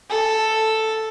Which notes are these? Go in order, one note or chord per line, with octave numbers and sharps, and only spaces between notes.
A4